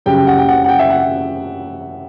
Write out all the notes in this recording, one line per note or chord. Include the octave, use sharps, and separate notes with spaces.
F#2 C#3 G3 G5
G5
F#5
G5
F#5
F#5
G5
E5
F#5